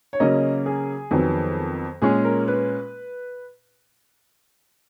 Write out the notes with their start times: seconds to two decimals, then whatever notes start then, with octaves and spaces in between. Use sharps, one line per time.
0.13 C#5
0.20 C#3 F#3 A#3 C#4 D#5
0.66 G#4
1.11 F2 D#3 F#3 B3
2.02 A#2 G#3 C#4 G#4
2.25 A#4
2.48 B4